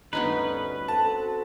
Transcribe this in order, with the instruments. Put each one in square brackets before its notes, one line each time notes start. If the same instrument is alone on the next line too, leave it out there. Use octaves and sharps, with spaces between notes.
[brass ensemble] D2 G2 [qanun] B3 C#4 D#4 [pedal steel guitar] B4
[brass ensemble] C4 F#4 A4 [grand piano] A5